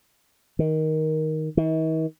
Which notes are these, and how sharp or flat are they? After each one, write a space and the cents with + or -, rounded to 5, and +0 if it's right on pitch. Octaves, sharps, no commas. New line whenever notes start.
D#3 +10
D#3 +45